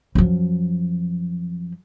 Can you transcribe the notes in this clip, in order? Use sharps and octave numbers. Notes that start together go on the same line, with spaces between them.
F#2 F3